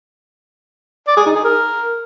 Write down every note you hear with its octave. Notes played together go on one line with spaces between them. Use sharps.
D5
G#4
D#4
G#4
A#4